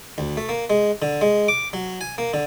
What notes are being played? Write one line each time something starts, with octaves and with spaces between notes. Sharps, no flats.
D2
A3
A#3
G#3
D3
G#3
D6
F#3
G#5
A#3
D3